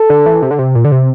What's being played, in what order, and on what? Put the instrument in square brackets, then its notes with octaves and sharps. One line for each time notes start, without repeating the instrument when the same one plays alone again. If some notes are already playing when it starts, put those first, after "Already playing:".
Already playing: [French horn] A4
[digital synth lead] D3
E3
C3
D3
C3
A#2
D3
C3